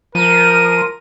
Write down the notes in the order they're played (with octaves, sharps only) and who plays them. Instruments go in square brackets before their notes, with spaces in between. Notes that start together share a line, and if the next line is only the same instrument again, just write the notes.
[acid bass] F3 [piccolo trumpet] A#4 [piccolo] D#7